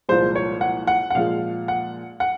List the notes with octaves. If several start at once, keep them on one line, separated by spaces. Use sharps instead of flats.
C2 A#2 F3 G#3 C5
C#5
F#5
F#5
F#5
A#2 F3 G#3 F5
F#5
F#5